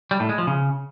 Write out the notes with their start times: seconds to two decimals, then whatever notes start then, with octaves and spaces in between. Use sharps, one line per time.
0.11 G3
0.20 A2
0.29 G#3
0.38 F3
0.47 C#3